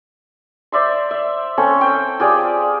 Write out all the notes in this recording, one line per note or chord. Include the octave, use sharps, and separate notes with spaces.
C5 D5 E5 C6
E5
C4 C#4 A4
C5 G5
F4 G4 G#4 D5